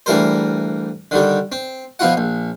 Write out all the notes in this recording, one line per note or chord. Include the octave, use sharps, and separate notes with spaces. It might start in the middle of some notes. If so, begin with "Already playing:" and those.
D2 E3 G3 A#4 C5
D3 D#3 G3
C4
B2 F3 E4 F4 F#5
A#1